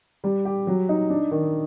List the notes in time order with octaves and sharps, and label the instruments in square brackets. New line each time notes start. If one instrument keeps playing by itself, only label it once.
[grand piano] G3
G4
F#3
D#4
D4
D#3